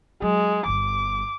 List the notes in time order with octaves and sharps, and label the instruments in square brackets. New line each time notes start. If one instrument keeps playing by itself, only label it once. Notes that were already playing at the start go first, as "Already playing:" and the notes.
[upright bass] F#3 [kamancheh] G#3
[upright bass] G1 G3 [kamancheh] D6